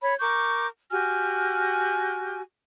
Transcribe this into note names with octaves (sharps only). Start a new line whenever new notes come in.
C#5 B5
A#4 C#6 D6 G6
F#4 G4 G#5 F6